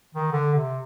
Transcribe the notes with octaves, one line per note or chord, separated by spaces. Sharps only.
D#3
D3
C3